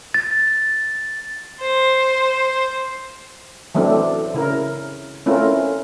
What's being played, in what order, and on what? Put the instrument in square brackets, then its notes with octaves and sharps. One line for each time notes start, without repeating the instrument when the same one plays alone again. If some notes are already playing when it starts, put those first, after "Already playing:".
[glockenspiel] A6
[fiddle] C5
[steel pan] E3 F#3 A3 C4 D4
C#3 E4 A#4
A3 C4 C#4 E4 F4 A#4